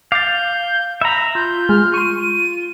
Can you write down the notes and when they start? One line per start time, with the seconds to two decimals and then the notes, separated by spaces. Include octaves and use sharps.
0.12 F5 D6 G6 A6
1.01 E5 A#5 B5
1.35 F4 G6
1.69 G#3 F6
1.94 C6 C#6 D#7